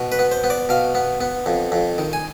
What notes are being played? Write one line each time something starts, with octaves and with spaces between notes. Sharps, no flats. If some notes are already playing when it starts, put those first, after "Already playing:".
Already playing: B2
B4
B3
C5
B3
D5
B2 F5
B3
B3
F2
F2
D#3
G#5